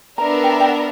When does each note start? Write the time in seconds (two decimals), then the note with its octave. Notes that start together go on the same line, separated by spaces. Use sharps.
0.18 B3 D4 A#4 E5 A#5
0.44 G5
0.53 A#5
0.60 G5
0.69 F#5